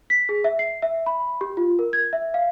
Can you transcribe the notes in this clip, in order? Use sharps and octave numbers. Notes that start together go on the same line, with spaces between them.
B6
G#4
E5
C7
E5
B5
G4
F4
A#4
G#6
E5
F5